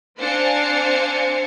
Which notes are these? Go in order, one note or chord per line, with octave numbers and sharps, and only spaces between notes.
C4 D4 C5 F5 G#5 C#7